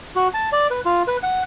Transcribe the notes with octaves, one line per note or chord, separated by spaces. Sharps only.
F#4
A5
D5
B4
F4
B4
F#5